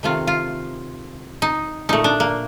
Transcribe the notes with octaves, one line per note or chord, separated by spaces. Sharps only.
C3 D#3 A3 F4
F4
D#4
A#2 A3 D#4
D4
A#3